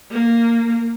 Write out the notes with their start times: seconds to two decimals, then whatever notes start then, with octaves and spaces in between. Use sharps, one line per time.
0.11 A#3